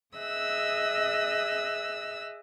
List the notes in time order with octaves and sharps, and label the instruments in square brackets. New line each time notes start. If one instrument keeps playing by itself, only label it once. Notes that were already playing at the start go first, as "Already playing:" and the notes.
[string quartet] G#4 D#5 E5 E6 F#6